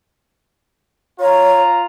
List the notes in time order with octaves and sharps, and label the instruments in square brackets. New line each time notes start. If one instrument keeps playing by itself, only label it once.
[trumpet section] F4 A#5 [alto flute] C#5